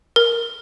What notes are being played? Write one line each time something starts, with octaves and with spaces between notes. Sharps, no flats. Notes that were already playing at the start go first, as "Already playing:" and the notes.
A#4